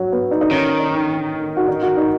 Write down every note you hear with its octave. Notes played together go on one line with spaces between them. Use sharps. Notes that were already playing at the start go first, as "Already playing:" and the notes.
Already playing: F#3
B3
D#4
D#4
D#3 C#4
D#4
F#4
D#4
F#4
D#4